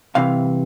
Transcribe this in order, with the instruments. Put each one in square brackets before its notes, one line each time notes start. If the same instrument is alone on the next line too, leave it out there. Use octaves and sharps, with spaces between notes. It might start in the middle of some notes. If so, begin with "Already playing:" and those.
[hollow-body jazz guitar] C2 C3 E3 F5